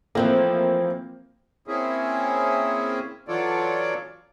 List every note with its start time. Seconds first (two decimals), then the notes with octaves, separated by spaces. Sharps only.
0.15 E3 F3 A3 A#3 C4
1.68 A#3 C4 C#4 E4 G#4
3.28 E3 F#3 F4 A4 C#5 D5